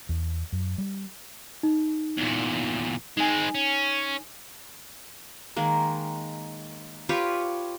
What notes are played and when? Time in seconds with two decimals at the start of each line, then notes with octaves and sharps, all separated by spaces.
0.09 E2
0.52 F#2
0.78 G3
1.63 D#4
2.18 E2 A#2
3.17 G#3 C4 D#4 G#5
3.55 C#4
5.56 D#3 G#3 A#3
7.09 F4 G4 B4 C#5